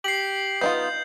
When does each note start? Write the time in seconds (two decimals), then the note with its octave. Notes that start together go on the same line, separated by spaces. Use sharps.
0.04 G4 C7 F#7
0.61 B3 D#4 F4 G6